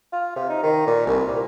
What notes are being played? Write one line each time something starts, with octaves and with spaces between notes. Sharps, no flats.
F4
C3
D#4
D#3
A#2
C2
A#2